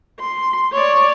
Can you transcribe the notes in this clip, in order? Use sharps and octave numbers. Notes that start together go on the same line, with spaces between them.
C6
C#5 D5